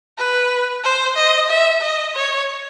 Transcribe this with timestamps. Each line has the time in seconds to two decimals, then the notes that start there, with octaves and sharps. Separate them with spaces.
0.18 B4
0.84 C5
1.16 D#5
1.49 E5
1.81 D#5
2.14 C#5